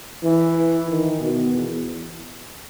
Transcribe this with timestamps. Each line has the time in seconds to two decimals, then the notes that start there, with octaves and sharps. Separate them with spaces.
0.23 E3
0.89 D#3
1.21 B2
1.54 E2